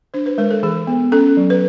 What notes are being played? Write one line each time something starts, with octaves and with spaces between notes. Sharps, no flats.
D4 C5
B4
G#3 A#4
A4
E3 G#4
B3
C#4 A4
F#3
B4